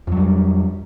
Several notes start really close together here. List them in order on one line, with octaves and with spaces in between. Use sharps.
F2 F#3 G3